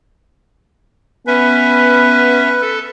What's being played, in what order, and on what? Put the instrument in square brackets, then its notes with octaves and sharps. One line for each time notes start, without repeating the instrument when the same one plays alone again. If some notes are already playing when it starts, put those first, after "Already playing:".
[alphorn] B3 [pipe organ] C#4 E5 [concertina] B4
[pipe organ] A4